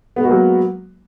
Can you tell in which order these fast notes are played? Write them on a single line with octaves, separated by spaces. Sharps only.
B3 G#3 F#4 A#3 F#3